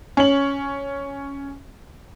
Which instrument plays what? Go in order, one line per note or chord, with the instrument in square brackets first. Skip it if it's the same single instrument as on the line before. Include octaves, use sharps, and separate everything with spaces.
[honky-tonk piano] C#4 F#7